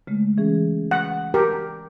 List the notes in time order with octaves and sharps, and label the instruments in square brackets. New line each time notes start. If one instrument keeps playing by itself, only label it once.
[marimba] C#3 G#3 A3
E3 C#4 G#4
[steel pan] F#5
G4 A#4